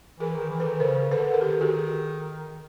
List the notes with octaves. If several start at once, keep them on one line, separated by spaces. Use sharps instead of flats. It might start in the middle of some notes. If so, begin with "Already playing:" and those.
E3 G#4 A#4
D#3
E3
A4 B4
D#3
C#3 A#4 C5
D3 A4 B4
A#4
D#3 G4 A4
F#4 G#4